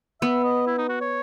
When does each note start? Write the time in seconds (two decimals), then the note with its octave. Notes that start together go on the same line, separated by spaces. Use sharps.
0.21 B3 E5
0.44 D#5
0.67 E4
0.78 D#4
0.89 F#4
1.01 C#5